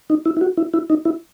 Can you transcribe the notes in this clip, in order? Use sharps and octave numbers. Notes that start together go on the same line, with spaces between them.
D#4
E4
E4
F#4
E4
E4
D#4
E4